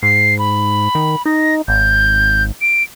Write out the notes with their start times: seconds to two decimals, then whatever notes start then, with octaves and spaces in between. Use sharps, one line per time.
0.03 G#2 C7
0.39 B5
0.95 D#3
1.26 D#4 A#6
1.68 G#1 G6
2.61 D7